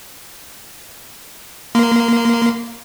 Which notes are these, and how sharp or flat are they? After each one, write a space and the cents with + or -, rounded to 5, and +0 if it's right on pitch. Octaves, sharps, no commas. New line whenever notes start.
A#3 +0 C6 -30